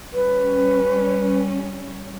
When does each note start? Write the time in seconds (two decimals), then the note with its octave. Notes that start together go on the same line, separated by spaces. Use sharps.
0.13 G3 C#4 B4